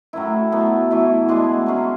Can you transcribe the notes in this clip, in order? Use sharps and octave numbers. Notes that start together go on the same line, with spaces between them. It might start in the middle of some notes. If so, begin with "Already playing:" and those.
A2 F#3 C#4 E4
B2 F#3 B3
E3 A3 E4
B2 G#3 D4 G#4
F#3 C#4 G#4